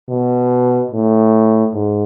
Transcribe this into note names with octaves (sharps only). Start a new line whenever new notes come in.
B2
A2
G#2